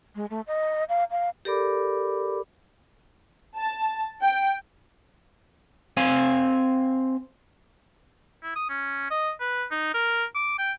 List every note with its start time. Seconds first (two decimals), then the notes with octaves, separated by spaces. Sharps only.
0.15 G#3
0.30 A3
0.47 D#5
0.89 F5
1.11 F5
1.45 G4 A4 A#4 D5 B5 D6
3.57 A5
4.22 G5
5.97 C4 F5 G#5
8.43 E4
8.55 D#6
8.69 C#4
9.10 D#5
9.40 B4
9.71 D#4
9.94 A#4
10.35 D6
10.58 G5